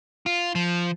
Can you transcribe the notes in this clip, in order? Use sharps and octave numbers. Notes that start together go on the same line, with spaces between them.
F4
F3